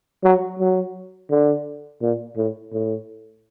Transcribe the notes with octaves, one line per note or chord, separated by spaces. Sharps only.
F#3
F#3
D3
A#2
A2
A2